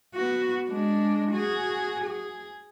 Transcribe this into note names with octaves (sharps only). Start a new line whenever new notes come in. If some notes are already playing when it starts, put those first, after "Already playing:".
B3 F#4
G#3 D4
F#4 G#4
G#4